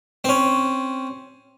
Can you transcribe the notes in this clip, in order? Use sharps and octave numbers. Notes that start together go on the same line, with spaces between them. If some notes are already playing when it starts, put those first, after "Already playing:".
C4 C#4